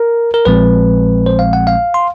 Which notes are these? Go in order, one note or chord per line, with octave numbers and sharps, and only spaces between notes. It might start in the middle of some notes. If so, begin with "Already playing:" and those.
Already playing: A#4
A#4
A#1 A#2 F3 G#3 C4 B4
C5
F5
F#5
F5
C6